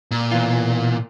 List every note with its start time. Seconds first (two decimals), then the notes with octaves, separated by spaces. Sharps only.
0.11 A#2
0.32 B2 E3 F4